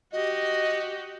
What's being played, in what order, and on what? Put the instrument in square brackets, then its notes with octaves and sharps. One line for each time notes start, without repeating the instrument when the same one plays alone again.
[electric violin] F#4 G4 [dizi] D#5